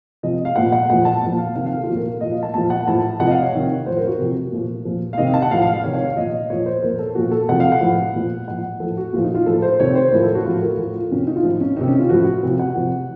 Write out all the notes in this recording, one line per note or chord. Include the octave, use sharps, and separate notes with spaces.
C3 F3 D#5
F5
A#2 F3 F#5
F#5
A#2 F3 F#5
A5
A#2 F3
F5
C3 D#3 F5
F5
A4
F4
A#2 F3 F#4
A#4
A#2 F3 D#5
F5
A5
A#2 F3 A5
F#5
A2 F3 A5
C3 F3 F#5
D#5
F5
C#5
C3 D#3
A2 F3 C5
A#4
F4
F#4
C3 F3 A#4
A#2 F3
A#2 F3
F5
C3 D#3 D#5
F5
A5
F#5
A2 F3 F5
F5
F5
C3 D#3 C#5
C#5
F5
A#2 F3 D#5
A#2 F3 C#5
C5
A#2 F3 A#4
A4
A#2 F3 F#4
A4
C3 F3 F#5
F5
F#5
A2 F3
A#2 F3
A2 F3 F#5
A2 F3 A4
F#4
A#2 F3 F4
D#4
F4
A2 F3 A4
C5
C3 D#3 C#5
C5
A2 F3 A#4
A4
F#4
A2 F3 F4
F#4
A#4
A4
A2 F3 F#4
F4
C3 D#3 C#4
D#4
F4
A2 F3 D#4
C#4
C3 D#3 D#4
C#4
F4
A2 F3 F#4
C3 F3
F#5
C3 F3